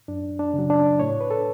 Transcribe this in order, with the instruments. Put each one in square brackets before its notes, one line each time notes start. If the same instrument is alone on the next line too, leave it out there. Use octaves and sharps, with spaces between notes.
[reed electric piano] F#2 D4
D4
C#3
F#3
D4
A2 C#5
B4
A4